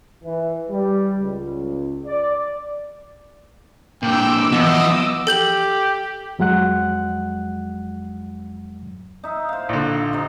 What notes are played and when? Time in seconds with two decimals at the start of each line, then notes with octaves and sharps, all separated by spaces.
0.24 E3
0.71 G3
1.19 C#2
2.06 D5
4.03 A#2 D3 G5 D6 E6
4.53 E3 F3 B3 D#5
5.27 G4 A4 G6 F#7
6.39 F2 F#3 G#3 F#5 F#6
9.24 D#4 E5
9.49 C5 F5
9.69 A#1 D3
10.13 C3 C4 D#4